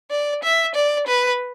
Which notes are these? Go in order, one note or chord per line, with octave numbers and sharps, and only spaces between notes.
D5
E5
D5
B4